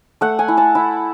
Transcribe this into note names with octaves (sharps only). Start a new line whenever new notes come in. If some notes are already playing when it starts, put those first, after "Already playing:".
A3 F#5
G#5
E4
A5
E4